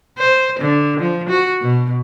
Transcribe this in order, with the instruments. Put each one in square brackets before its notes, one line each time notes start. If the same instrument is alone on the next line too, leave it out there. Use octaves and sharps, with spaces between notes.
[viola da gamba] C5
D3
F3
F#4
B2